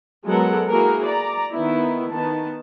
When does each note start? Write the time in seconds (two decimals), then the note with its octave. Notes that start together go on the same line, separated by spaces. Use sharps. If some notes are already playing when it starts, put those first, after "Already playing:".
0.25 F#3 G#3 B3 A4 A#4 F#5
0.68 A#3 E4 F#4 G#4 A#4
1.05 D5 A#5
1.52 D#3 B3 E4
2.10 D#3 B3 A5